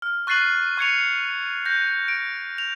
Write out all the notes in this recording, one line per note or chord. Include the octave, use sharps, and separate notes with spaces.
F6
C#6 F#6 A6 C7 D#7 F#7
C#6 G#6 C#7 F7
G6 A#6
D7
F7